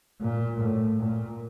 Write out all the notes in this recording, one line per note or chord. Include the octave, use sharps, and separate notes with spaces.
A#2
A2
A#2